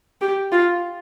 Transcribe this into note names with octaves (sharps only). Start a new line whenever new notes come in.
G4
F4